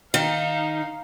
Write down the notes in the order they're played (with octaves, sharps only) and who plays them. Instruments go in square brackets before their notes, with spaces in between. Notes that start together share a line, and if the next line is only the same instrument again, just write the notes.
[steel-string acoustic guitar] D#3 [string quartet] D#4 F5